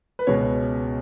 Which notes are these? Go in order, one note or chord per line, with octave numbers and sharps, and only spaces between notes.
B4
C#2 B2 G#3 C#5